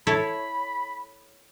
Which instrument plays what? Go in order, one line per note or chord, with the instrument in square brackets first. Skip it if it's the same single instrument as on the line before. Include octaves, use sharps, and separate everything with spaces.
[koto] E4 A4 C#5 [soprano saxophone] B5